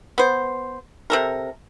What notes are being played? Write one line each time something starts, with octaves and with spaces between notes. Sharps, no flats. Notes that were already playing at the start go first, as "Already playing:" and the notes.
B3 C5
C3 A4 A#4